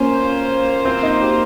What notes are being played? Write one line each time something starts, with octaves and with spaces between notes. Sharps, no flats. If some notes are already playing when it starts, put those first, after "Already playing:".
Already playing: A#3 C#4 F4 C5
C4
D#4
G4